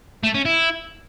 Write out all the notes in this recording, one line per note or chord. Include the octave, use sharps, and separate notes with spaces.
A3
C#4
E4